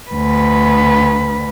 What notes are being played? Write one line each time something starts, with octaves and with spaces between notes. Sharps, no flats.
D2 B4